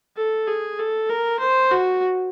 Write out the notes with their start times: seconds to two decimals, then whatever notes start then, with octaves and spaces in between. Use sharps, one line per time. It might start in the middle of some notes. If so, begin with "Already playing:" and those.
0.17 A4
0.47 G#4
0.79 A4
1.09 A#4
1.40 C5
1.71 F#4